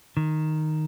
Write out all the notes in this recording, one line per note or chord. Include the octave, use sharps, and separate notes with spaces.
D#3